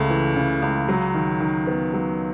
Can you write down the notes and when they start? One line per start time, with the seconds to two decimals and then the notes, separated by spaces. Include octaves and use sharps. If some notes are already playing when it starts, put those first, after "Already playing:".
Already playing: C#2 C#3 A3
0.10 E3
0.36 C#3
0.62 C#2
0.89 F#3
1.14 D#3
1.40 D#3
1.67 B3
1.94 F#3